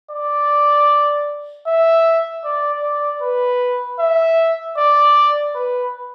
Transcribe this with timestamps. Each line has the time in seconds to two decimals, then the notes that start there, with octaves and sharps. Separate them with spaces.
0.11 D5
1.67 E5
2.44 D5
2.83 D5
3.22 B4
3.99 E5
4.77 D5
5.55 B4